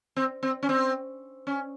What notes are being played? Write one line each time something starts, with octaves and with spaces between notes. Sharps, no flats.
C4
C4
C#4
C4
C#4